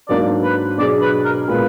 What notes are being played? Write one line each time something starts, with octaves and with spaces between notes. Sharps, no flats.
G#2 F#3 A#3 D4 D5
B4
B2 F#3 D4 G#4 D5
B4
A#4
A#2 G#3 B3 F4 A#4 B4